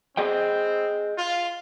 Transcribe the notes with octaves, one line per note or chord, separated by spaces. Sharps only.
C4 G#4 D#5 G5
F4